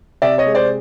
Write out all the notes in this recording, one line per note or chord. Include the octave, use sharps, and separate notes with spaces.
C3 D5 E5
C#5 D#5
G#3
C5 D5